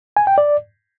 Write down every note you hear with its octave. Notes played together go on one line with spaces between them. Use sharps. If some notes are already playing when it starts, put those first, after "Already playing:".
G#5
G5
D5